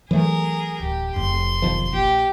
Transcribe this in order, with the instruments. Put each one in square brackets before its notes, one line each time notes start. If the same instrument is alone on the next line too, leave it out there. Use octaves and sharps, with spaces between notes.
[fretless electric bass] E3 F#3 A3 [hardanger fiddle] G#4 A#4
[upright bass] D1 [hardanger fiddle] G4
[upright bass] F1 F2 [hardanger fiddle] C6
[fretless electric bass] B1 D#3 F3
[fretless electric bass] A#1 [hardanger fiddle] G4